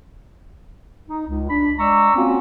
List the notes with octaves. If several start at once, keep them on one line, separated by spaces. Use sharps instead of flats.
D#4
C#2
D4 B5
G#3 D5 A#5 C#6 E6
A#3 C4 C#4 F4 F#4